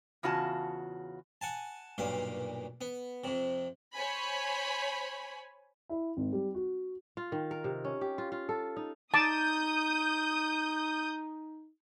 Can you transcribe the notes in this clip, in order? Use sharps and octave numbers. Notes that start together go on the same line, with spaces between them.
E2 C#3 F4 F#4 G#5 A5
F#5 G#5 A5
B1 G2 A#2 F5
B3
F2 C3
C5 C#5 G#5 B5
E4
G#1
G3
F#4
F4
D#3
A#4
C3
C#4
G4
F4
F4
A4
D#4
D#4 A5 D6 D#6 G6